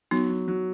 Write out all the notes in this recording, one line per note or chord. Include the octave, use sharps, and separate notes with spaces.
F#3 B3 D#4
F#3
F#3